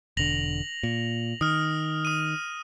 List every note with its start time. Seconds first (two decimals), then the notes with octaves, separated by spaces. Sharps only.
0.17 E1 D3 A#6 F7 F#7
0.83 A#2
1.41 D#3 D#6 F6
2.05 D#6 D#7